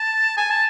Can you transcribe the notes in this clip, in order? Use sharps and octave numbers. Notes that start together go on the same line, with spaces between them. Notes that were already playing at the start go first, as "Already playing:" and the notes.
Already playing: A5
G#5
A5